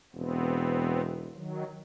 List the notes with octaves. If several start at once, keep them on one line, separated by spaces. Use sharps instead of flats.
E1 B3 C4
D#3 F#3